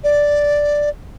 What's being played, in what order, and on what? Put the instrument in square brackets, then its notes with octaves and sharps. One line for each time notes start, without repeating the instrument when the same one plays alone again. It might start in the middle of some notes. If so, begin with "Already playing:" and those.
[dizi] D5